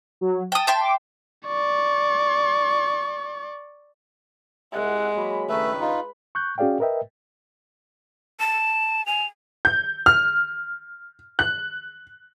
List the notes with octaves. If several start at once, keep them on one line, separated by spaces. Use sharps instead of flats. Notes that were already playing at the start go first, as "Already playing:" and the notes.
F#3
G5 A5 D#6
E5 G5 C6
D6
D5 C#6
C2 G#3 E5 F#5
F#3 A#3 B5
C#2 G2 D#3 A3 B4 E5
D#4 F4
C#6 F#6 G6
C#4 F#4 G#4 D5 F5 G5
A#4 B4 D#5 E5 G5
A5 E7
G#5 F7
G6
F6
F#6